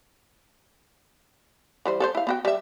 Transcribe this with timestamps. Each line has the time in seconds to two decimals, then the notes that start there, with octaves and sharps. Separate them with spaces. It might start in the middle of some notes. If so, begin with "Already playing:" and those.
1.85 E3 G3 C5
2.00 A4 A#4 C5
2.15 E4 F5
2.27 B3 F#4 G5
2.45 G3 E5